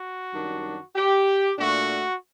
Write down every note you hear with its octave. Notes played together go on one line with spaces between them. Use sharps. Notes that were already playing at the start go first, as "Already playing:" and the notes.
Already playing: F#4
F#2 D#3 G3 D4
G4
A#2 A3 D4 F#4